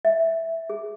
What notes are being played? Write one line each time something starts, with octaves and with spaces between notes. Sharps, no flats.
E5
G#4